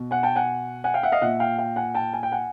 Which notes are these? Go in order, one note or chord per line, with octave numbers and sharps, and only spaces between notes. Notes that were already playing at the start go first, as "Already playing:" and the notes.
Already playing: B2
F#5 G#5
G5 A5
F#5 G#5
F#5 G#5
F5 G5
E5 F#5
D#5 F5
A#2 E5 F#5
F5 G5
F5 G5
F#5 G#5
G5 A5
G#5
G5
F#5 G#5